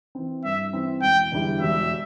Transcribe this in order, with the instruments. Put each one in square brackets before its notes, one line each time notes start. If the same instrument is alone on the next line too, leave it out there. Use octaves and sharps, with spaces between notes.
[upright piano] E3 C4
[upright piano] G2 [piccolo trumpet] E5
[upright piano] E3 C4
[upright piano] E1 [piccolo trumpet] G5
[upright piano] E2 D3 G3 E4
[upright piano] E1 [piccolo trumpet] E5